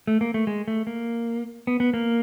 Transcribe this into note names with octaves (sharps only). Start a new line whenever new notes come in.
A3
A#3
A3
G#3
A3
A#3
B3
B3
A#3